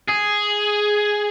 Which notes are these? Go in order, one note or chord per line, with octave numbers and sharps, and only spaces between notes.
G#4